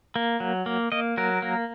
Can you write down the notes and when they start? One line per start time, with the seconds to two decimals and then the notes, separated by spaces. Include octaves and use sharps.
0.16 A#3
0.40 F#3
0.66 A#3
0.92 A#3 D#5
1.18 F#3 A#4
1.42 A#3